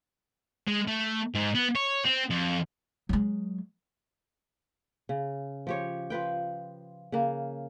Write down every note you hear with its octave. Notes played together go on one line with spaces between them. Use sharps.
G#3
A3
G#2
B3
C#5
C4
F2
F#3 G#3
C#3
F3 G4 C#5
F3 F4 B4 G5
C#3 A#3